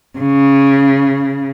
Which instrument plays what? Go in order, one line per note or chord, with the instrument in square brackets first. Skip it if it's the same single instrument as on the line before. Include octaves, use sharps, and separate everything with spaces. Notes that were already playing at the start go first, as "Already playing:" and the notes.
[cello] C#3